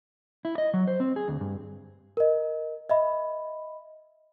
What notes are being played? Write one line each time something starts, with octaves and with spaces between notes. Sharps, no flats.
E4
D#5
F#3
C5
C4
G#4
D2
G2
A#4 D#5
D#5 E5 B5